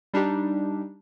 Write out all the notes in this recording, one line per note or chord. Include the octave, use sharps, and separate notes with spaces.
G3 D4 D#4 G4